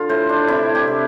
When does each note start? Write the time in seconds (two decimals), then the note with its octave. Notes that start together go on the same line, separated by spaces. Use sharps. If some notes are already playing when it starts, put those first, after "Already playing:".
Already playing: D3 F4
0.09 A2 C5
0.29 D4
0.48 C3 E4
0.75 G4
0.87 C3